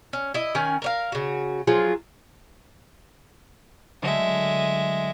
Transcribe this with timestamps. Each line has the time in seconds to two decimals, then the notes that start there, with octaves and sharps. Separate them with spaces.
0.13 C#4
0.34 E4 D#5
0.55 D#3 C#4 G#5
0.82 A#4 C#5 F5
1.12 C#3 F#4
1.67 F3 F#3 F4 G#4
4.02 D3 F#3 G#3 A3 E5